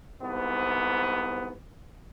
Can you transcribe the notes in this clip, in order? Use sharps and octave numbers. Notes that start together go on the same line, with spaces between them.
C2 G#2 B3